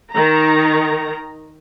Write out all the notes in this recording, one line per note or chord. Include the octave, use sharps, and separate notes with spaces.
D#3 A#5